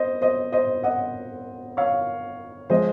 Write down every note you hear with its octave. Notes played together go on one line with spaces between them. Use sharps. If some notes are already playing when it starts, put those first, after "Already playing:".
Already playing: C5 D#5
C5 D#5
C5 D#5
D#5 F#5
C#5 F5
F3 G#3 C5 D#5